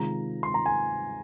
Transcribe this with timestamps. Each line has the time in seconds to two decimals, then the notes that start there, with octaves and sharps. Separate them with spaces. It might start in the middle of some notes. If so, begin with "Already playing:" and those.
Already playing: C3 D#3 G#3 F4 A#5
0.43 C6
0.54 A#5
0.66 G#5